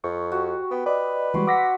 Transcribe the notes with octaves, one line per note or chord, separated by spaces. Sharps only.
F2 C#6
F#4 G4
B3 G5
B4 D5 D#5
E3 G3 G#3 F#4 D5 C6
F#5 D6 E6 A#6 B6